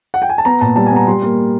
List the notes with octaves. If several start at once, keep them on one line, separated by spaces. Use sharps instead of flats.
F#5
G5
G#5
A5
B3 A#5
A#2 A5
G3 A5
G#5
B3 A#5
G3 C6
A#3